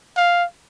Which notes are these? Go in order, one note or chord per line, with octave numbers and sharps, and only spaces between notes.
F5